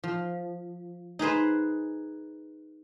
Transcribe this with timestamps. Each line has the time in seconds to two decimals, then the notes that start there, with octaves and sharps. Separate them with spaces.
0.03 F3
1.19 D#4 G#4 B4 C5